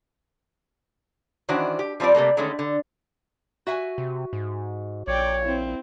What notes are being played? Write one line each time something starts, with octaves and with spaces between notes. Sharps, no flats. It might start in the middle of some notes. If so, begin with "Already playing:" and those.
D#3 E3 C#4 D4 F#4 C5
G4
F3 G3 C4 F4 D5
C3 G3 A3 A#3
D3 D#3 G#3 A3 C#4
D3
F#4 E5 G#5
C3
G#2
A#1 C#5 D5 G5
C4 E4